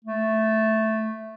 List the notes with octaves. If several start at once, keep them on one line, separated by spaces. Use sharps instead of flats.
A3